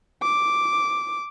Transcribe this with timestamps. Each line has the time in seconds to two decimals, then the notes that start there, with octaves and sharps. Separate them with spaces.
0.22 D6